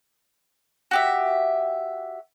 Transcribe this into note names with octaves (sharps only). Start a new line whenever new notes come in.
F#4 G4 E5